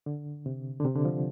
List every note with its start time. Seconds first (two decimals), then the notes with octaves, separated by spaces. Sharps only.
0.06 D3
0.46 C3
0.80 D3
0.85 C3
0.96 D3
1.05 F3